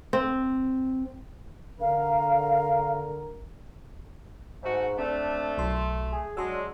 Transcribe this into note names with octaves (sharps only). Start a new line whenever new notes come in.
C4
D3 A#4 F5
G#2 A3 F#4
A3 C4 D4
B1 F#3 C6
G#4
F#3 G#3 D4 C6 E6